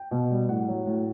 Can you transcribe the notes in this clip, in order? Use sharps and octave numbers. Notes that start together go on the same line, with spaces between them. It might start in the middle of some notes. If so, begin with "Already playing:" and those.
Already playing: G5
B2
G3
A2 F#5
F#3
A2